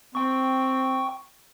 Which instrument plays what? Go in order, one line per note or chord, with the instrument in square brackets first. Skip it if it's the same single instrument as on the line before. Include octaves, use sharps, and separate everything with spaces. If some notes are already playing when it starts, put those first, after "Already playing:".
[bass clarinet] C4 [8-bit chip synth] G5 C#6